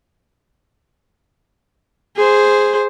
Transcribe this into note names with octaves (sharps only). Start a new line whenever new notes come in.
G#4 C5